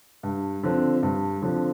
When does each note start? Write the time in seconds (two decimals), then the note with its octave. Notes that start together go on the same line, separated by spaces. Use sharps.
0.23 G2
0.63 D3 F3 C4
1.03 G2
1.42 D3 F3 C4